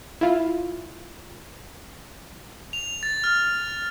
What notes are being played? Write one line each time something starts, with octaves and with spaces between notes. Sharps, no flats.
E4 F4
F7
A6
F6